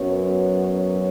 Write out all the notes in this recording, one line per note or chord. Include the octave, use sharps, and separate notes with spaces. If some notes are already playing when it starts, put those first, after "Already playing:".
Already playing: F#2 F#3 B3 C#5
C#5